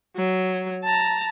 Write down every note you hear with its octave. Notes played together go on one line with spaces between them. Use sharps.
F#3
A5 A#5